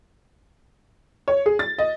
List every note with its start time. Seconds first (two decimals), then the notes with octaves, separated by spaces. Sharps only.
1.28 C#5
1.46 G#4
1.59 A6
1.78 D#5